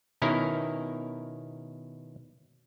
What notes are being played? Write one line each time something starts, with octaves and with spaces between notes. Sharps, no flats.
B2 D#3 C#4 E4 A#4